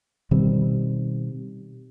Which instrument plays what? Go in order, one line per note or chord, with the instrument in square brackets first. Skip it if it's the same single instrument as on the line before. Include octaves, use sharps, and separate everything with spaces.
[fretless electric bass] B2 D#3 G3 C4